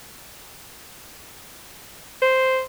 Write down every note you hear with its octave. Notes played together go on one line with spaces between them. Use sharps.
C5